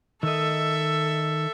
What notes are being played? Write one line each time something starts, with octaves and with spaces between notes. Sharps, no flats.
D#3 A4 D#5 E5